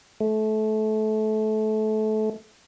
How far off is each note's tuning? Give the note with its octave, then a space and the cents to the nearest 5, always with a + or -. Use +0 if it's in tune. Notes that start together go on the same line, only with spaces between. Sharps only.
A3 -25